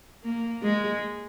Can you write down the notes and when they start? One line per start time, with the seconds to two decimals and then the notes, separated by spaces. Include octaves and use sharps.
0.24 A#3
0.62 G#3